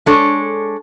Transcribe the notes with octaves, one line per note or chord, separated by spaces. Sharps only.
G#3 D4 A4 C#5